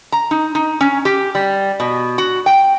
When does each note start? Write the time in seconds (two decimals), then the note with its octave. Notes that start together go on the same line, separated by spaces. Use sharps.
0.12 A#5
0.31 D#4
0.55 D#4
0.81 C#4
1.05 G4
1.35 G3
1.80 B2
2.18 F#4
2.46 G5